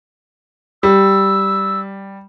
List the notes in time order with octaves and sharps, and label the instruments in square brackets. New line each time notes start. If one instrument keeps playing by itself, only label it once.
[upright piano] G3 [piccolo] E6